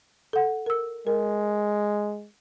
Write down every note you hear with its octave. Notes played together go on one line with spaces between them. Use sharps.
A4 F#5
A#4 E6
G#3 A#4